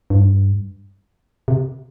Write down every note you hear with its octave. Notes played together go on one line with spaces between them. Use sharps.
G2
C3